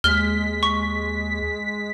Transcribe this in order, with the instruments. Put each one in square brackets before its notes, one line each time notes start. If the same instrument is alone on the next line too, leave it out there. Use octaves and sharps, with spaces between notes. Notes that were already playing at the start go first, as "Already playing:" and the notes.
[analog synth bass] D#2 [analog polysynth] G#3 B6 [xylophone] F6 G7
[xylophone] C#6